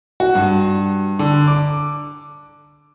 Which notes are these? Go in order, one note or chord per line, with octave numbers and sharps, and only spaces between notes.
F#4
G2
D3
D6